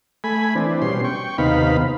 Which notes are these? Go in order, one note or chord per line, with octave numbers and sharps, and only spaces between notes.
A3 G#5 B5
E3 C4 D4
B2 G3 C#4 C6
G5 C#6
D#2 C3 B3 D#4 F5 B5